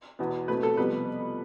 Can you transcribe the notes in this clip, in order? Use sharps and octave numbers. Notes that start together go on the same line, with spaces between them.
E2 B2 B3
B2 A3 C4 B4
A4
F2 C3 G3 B3 B4